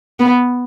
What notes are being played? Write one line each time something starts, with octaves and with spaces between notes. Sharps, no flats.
B3